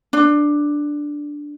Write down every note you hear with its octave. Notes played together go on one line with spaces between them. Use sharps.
D4